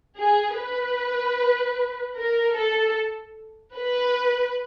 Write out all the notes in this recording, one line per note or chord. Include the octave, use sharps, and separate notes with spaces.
G#4
B4
A#4
A4
B4